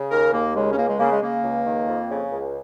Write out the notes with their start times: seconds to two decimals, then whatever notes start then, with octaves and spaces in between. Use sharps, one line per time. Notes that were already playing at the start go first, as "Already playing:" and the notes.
Already playing: C#3
0.11 D#2 A#4
0.33 D#2 A#3
0.55 C#3 G#3
0.71 C#4
0.77 C#2 A#3
0.88 G#3
0.99 C#3 A#3
1.11 G#3
1.21 C#3 A#3
1.44 C#2
1.65 D#3
1.88 F2
2.10 C#3
2.31 C#2